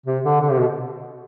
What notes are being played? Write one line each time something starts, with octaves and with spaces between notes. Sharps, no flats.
C3
D3
D3
C3
B2